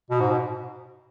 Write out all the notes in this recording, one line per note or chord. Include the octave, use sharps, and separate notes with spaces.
B2
G#2
B2